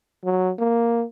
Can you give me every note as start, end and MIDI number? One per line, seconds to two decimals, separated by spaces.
0.25 0.51 54
0.58 1.05 58